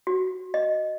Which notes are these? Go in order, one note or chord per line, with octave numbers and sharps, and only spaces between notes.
F#4
D#5